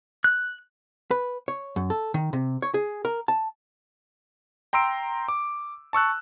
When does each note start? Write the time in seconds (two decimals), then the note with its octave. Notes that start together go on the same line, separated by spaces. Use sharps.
0.24 F#6
1.11 B4
1.48 C#5
1.76 F#2
1.90 A4
2.14 D#3
2.33 C3
2.62 C#5
2.74 G#4
3.05 A#4
3.28 A5
4.73 G5 A#5 C6 E6 D7
5.28 D6
5.93 A5 C#6 E6 F#6